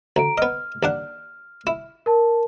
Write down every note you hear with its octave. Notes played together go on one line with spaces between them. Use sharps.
D2 A#5 D7
B3 D#5 F6
D#2 D4 F#5
E4
A#4 A5